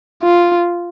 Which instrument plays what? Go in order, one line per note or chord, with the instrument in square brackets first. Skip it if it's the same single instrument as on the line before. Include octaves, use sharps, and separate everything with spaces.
[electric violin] F4